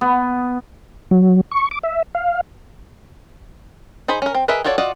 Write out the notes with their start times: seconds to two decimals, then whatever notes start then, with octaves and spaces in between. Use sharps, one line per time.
0.01 B3
1.11 F#3
1.51 C#6
1.71 D6
1.83 E5
2.15 F5
4.08 D#4 G#4 C5 B5
4.22 C#4 A#4
4.35 C4
4.48 G#4 A#4 B4 D#5 E5
4.64 F4 F#4 A4 C#5 D5
4.78 F4 F#4 D5 D#5